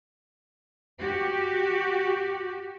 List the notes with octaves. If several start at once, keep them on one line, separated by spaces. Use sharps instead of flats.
F#4 G4